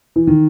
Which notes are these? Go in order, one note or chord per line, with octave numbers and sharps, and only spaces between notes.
E3
D#3